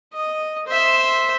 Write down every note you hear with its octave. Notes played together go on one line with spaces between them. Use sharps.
D#5
C5 E5